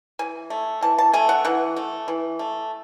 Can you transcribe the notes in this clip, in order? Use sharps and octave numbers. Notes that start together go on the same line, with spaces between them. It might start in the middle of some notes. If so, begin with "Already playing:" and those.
E3 G#5
A3
E3 A5
A5
A3 G#5
F#5
E3 F#5
A3
E3
A3